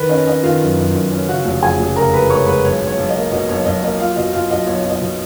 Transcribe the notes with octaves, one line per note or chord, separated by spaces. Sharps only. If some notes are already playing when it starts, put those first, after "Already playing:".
Already playing: D#3 B4 B5
C#4 D#5
C#4 D#5
D#3 F4 F5
F#2
F#2
F#2
C#4
C#3 F#4 F#5
F1
F2 G#4 G#5
F1
C#3 A#4 A#5
G#3 B4 B5
G#3 C#5 C#6
G#3 B4 B5
B1 C#5
B1
C#5
B1
D#5
A#3
B2 D#5
B1 C#5
B1 D#5
A#3 D#5
F#3 F4 F5
B2 D#5
B2 F4 F5
B1 D#5
B1 C#5
B2
D#5
B2